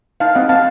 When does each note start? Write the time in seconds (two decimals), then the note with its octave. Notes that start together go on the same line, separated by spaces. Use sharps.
0.20 D#4 F5 A5
0.35 C4 D#5 F#5
0.49 C4 F5 A5